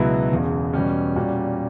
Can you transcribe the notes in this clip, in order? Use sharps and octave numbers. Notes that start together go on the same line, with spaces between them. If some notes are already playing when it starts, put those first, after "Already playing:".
Already playing: C#2 B2 F#3 B3 E4
E1 E2 C#3
E2 B2 G3 C#4
A#2 G3 C#4 F#4